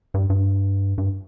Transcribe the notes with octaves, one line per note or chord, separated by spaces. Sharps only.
G2
G2
G2